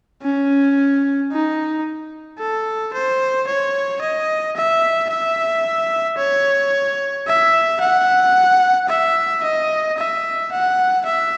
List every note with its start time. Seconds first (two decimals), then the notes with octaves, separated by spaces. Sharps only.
0.22 C#4
1.32 D#4
2.39 A4
2.94 C5
3.47 C#5
4.02 D#5
4.56 E5
5.10 E5
6.18 C#5
7.27 E5
7.80 F#5
8.89 E5
9.43 D#5
9.98 E5
10.52 F#5
11.06 E5